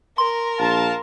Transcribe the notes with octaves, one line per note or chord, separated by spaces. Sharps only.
A#4 C6
A#1 F5 A5